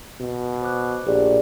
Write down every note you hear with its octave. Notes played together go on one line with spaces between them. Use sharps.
B2
C5 D6 F#6
A#1 G4 G#4 D5